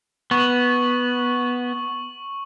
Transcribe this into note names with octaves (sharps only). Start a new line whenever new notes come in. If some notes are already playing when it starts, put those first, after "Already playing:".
B3 C#6 F#7